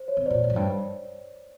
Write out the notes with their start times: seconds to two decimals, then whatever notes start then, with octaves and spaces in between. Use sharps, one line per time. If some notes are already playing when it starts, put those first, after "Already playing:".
Already playing: C5
0.08 C#5
0.17 C3
0.26 A#2 C5 D5
0.44 A2
0.50 F#2
0.56 G2